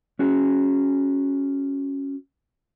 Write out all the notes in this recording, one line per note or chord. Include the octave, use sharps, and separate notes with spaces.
C#4 F#4 G#4